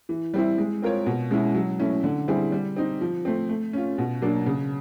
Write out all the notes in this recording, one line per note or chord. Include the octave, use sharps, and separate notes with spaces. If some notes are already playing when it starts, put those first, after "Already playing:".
E3
G3 C4 E4
G#3
C4 F4 A#4 C#5
B2
G#3 C#4 E4
F#3
A3 C#4 E4
D3
G3 C4 E4 G#4
G3
C4 D#4
F3
A3 C4
A3
C#4 F4
B2
F#3 A#3 D4
C#3